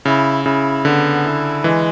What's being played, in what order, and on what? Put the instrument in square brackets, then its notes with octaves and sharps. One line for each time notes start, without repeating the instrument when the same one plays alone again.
[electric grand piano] C#3 [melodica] E4
[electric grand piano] C#3 [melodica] E4
[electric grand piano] D3 [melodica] B3
[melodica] E4
[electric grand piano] E3 [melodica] G#3